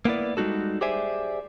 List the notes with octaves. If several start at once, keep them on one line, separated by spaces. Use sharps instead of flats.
A#3 B3 E4 D5
G3 G#3 D#4 F#4 A4
G4 G#4 C5 D5 E5 G#5